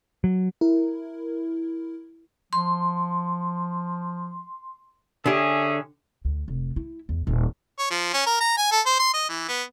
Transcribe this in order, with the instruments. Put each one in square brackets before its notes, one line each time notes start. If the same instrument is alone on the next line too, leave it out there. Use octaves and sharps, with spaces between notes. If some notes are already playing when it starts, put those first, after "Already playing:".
[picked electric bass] F#3
[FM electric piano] E4 A#4
[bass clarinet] F3 [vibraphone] C6
[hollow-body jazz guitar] D3 G4 [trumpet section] C#4 G#4 E5
[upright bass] D2
F1
E4
E2
D#1
[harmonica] C#5
F3
C#4
A#4
A#5
G#5
A4
C5
C6
D#5
E3
B3